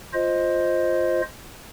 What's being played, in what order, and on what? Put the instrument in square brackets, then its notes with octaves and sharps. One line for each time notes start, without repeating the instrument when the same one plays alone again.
[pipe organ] F4 C5 D#5